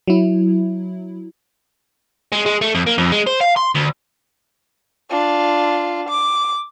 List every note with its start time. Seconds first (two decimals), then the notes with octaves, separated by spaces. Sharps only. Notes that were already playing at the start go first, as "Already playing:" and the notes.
0.08 F#3 E4
2.32 G#3
2.46 G#3
2.61 A3
2.75 F2
2.87 A#3
2.98 F2
3.12 G#3
3.27 C5
3.41 F5
3.57 C6
3.75 D2
5.10 D4 F4
6.09 D6